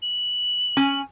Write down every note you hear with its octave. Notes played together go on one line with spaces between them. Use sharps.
F#7
C#4 G#5